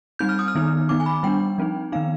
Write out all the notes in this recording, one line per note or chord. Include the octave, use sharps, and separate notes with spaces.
G3 C4 D#4 G6
F6
D#6
F6
D#3 B3 D#4
D#3 B3 D#4 D6
G#5
B5
G3 B3 D4 G5
F3 C4 D#4
D#3 B3 D#4 F5